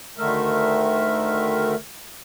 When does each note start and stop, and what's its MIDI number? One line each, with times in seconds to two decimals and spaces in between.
0.18 1.74 38
0.18 1.74 50
0.18 1.74 51
0.18 1.74 57
0.18 1.74 70
0.18 1.74 76